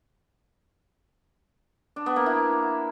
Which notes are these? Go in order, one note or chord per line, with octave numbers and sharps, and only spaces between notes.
D4
B3
A#3
E4